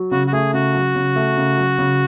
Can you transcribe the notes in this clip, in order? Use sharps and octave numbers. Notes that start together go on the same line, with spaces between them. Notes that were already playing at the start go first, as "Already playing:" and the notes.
Already playing: F#3
C#3 F#4
F#4
A3 G#4
C#3 F#4
F#3
C#3
A3
C#3
F#3
C#3